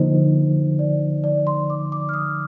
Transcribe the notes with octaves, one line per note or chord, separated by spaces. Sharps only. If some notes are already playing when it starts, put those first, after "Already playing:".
Already playing: D3 F3 A#3 D#4 C5
D5
D5
C6
D6
D6
F6
D#6